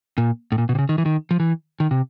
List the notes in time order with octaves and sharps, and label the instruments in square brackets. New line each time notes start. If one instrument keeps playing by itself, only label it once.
[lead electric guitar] A#2
A2
A#2
B2
C3
C#3
D#3
E3
D#3
F3
E3
D#3
C3